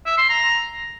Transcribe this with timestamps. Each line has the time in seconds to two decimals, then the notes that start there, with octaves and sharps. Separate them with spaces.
0.06 E5
0.18 C6
0.30 A#5